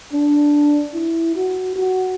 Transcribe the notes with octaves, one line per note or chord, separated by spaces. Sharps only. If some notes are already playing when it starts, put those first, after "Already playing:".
D4
E4
F#4
F#4